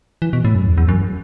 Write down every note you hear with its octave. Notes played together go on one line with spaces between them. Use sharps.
E3
B2
A2
F#2
E2
E2
F#2